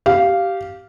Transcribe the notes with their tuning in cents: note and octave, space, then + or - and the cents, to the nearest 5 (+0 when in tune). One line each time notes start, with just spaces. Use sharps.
G4 -15 F5 -5